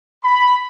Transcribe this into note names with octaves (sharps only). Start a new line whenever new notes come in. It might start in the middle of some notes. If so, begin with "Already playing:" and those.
B5